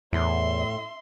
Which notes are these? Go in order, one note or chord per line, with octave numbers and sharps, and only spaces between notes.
E2 A2 E5 C6